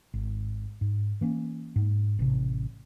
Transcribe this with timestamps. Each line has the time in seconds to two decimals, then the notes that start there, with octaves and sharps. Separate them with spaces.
0.14 G#1
0.81 G#2
1.21 E3 A#3 C#4
1.76 G#2
2.19 A1 C3